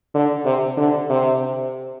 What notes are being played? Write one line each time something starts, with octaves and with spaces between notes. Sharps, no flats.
D3
C3
D3
C3